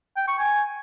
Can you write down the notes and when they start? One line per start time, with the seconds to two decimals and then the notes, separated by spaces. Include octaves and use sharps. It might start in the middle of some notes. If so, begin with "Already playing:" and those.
0.17 G5
0.28 C#6
0.39 G#5